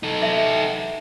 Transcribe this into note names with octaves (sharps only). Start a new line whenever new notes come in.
D#4 A4
E5